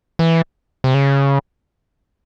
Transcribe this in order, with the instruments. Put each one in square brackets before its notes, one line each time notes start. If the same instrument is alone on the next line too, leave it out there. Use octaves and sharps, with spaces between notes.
[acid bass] E3
C3
C#3